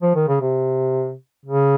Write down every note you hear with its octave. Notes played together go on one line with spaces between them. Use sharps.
F3
D#3
C#3
C3
C#3